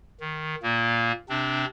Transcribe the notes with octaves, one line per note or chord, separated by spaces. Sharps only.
D#3
A#2 A#3
C3 C4 D4